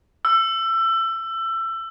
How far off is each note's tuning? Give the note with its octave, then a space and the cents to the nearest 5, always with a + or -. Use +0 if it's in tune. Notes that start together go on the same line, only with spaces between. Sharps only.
E6 +25